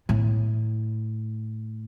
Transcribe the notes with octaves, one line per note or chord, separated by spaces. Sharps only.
A2